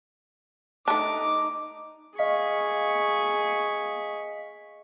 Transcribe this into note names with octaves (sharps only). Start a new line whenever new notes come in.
A3 D4 D#4 D6
G#4 D#5 F5 C#6 B6